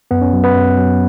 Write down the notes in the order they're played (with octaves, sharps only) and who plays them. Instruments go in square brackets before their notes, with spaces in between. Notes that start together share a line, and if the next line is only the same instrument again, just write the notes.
[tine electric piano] F#2 B3
C#4
F#3
B3 B4
F#2
F#3